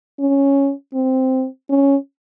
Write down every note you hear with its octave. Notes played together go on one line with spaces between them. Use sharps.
C#4
C4
C#4